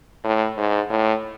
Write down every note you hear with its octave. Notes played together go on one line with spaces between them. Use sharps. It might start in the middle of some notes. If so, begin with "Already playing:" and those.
A2
G#2
A2